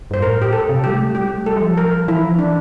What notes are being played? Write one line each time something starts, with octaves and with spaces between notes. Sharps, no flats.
G2 C5
A2 A#4
A#2 G4
A4
C3
G3 G4
A3
G3 G4
A3
G3
A4
G3
F3
A#4
E3 E4
F3
E3 D4